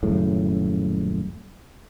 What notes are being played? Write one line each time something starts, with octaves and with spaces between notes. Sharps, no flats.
D#1 F#2 A2 C#3